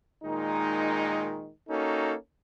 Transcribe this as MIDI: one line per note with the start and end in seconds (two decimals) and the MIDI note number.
0.24 1.50 46
0.24 1.50 51
0.24 1.50 56
0.24 1.50 63
1.70 2.14 58
1.70 2.14 61
1.70 2.14 63
1.70 2.14 66
1.70 2.14 69